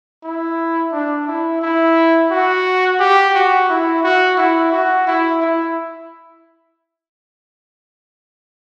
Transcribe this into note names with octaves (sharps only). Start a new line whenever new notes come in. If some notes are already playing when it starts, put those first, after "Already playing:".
E4
D4
E4
E4
F#4
G4
F#4
E4
F#4
E4
F#4
E4
E4